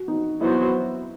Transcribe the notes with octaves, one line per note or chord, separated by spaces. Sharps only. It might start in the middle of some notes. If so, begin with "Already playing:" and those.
Already playing: F#4
D#4
F#3 B3 E4 F#4 C5